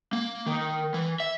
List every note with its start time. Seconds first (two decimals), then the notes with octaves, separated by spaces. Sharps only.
0.13 A#3
0.46 D#3
0.94 E3
1.20 E5